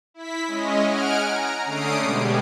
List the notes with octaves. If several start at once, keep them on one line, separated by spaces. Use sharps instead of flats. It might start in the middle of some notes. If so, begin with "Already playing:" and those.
E4 B6
G#3 C#4 D#5
F#5 G#5 F6 D7
A#5
D3 A3 C#4 D#6 C7 D7
B2 G3 G#3